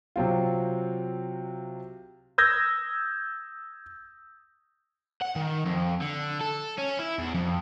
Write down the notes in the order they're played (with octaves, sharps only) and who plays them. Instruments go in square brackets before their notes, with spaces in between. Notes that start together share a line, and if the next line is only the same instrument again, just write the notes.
[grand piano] C3 F#3 C4 F4
[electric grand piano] D#6 E6 G6 G#6 A#6
[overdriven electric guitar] F#5
D#3
F2
D3
A4
C#4
E4
E2
F2